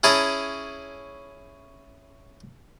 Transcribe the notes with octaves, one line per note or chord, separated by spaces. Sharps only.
C#4 E4 G#4 A5 A#5